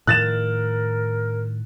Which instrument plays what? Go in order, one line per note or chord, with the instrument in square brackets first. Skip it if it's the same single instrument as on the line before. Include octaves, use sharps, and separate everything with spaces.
[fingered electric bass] A2 D#3 F3 [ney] A#4 [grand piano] F#6 A6 E7